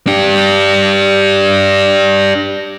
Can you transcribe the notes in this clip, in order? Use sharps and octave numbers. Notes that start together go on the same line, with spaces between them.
D4 G4